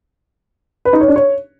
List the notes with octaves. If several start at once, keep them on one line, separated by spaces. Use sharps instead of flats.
B4
D#4
C#5
D4
C#5